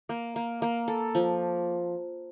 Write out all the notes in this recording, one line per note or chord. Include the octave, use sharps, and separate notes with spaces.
A#3
A#3
A#3
A4
F3